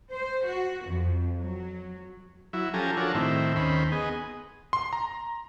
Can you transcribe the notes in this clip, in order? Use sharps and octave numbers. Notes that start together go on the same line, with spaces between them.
C5
F#4
F2
F#3
F#3 E4
F3 C#4 G4 A4 G#5 A#5
F3 D4 F#4 A4 A#4 C#5
A2 D#3 C4 E4
D#2 D#3 C#4 C5 B5
B3 G#4 D#5
C6
A#5